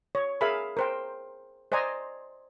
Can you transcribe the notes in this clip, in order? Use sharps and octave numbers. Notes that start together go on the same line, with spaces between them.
C#5
G#4 A#4 E5 F5 G#5 B5
A#4 C5 G5
C5 D5 D#5 G#5 A#5